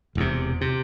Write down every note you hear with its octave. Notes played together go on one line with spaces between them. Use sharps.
E1 E2 C3
C3